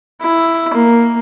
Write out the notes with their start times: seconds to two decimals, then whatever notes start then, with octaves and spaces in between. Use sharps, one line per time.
0.22 E4
0.74 A#3